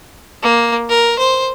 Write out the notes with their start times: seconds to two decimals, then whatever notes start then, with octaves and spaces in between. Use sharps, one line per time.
0.42 A#3
0.89 A#4
1.19 C5